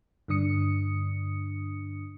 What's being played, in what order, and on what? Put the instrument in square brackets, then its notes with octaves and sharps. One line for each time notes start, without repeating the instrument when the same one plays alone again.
[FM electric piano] G2 D3 D4 D#6 C#7